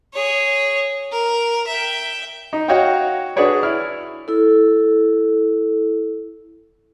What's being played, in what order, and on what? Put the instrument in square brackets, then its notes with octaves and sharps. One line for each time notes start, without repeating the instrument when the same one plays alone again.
[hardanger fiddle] G#4 C#5
A#4
E5 G5
[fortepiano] D#4
F#4 C#5 D#5 F5 G5
D4 F#4 G#4 B4 C#5 D5
E4 F6
[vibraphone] E4 A4